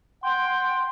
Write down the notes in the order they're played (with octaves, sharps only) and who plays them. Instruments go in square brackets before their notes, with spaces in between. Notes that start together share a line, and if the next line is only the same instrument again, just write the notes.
[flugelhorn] F#5 [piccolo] G5 [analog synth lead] C6